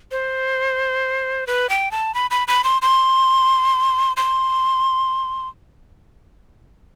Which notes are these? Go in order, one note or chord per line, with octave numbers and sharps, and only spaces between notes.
C5
B4
G5
A5
B5
B5
B5
C6
C6
C6